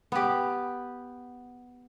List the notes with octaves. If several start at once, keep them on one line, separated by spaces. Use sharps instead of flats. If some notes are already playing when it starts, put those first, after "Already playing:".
B3 G4